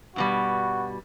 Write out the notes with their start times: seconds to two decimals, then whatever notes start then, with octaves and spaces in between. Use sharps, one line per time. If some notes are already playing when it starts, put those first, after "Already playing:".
0.16 G2 B2 G3 F#4